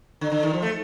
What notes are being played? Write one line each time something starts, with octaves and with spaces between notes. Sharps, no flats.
D3
D3
D#3
F3
A3